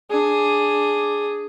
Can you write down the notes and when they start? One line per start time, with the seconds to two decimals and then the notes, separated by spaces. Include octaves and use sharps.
0.11 D4 G#4